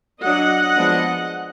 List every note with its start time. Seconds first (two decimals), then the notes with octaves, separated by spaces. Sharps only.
0.23 F#3 D4 D#5 F#5
0.76 F3 G#3 B3 D4